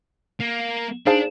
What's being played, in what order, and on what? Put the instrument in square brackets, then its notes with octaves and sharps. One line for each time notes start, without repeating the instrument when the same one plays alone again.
[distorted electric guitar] A#3
[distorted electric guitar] D4 [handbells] D#4 G#4 C5 F5 A5